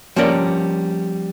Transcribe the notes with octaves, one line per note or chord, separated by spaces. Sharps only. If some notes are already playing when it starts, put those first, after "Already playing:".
F3 G3 A#3 C#4 A#4 D5